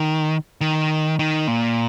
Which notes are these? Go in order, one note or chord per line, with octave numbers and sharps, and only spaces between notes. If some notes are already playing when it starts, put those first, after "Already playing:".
Already playing: D#3
D#3
D#3
A#2